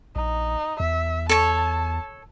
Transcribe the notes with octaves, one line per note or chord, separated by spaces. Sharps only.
A#1 D#4
E2 E5
A4 C#5 A5